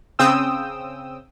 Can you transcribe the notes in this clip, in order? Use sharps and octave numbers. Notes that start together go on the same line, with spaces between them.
C#3 C4 G5 D#6 E6